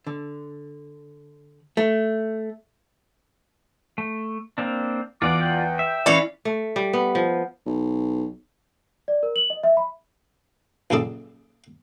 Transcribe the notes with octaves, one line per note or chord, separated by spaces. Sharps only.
D3
A3
A3
A#3 C4 D4
E2 F4 D5 F#5 D6
G5
E5
E3 C#4 D5 F5
A3
G3
B3
F3
B1
D5
A#4
F#7
D#5
E5
B5
A#1 F#2 C#3 G#4 A4 D5